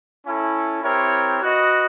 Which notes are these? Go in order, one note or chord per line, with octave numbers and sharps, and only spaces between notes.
C#4 E4 A4
C4 E4 G4 A#4 C#5
F#4 B4 D#5